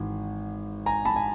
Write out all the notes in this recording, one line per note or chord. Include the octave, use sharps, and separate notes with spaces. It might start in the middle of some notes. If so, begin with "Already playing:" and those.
Already playing: G#1 G#2 E3
G#5 A#5
A5 B5
G#5